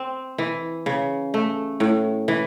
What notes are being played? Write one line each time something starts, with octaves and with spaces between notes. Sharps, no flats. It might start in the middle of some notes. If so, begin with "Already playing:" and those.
Already playing: C4
E3
C#3
A3
A2
E3